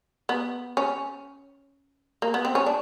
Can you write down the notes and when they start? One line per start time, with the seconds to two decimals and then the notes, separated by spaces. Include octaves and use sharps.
0.29 B3
0.77 C#4
2.22 A#3
2.34 B3
2.45 C4
2.55 C#4
2.66 D4